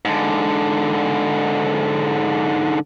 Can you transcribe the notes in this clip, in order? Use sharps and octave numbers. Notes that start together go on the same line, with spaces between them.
G#2 D3